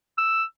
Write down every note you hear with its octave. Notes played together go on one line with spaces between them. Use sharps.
E6